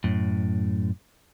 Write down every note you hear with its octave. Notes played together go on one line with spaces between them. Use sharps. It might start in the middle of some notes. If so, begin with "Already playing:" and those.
F#2 A2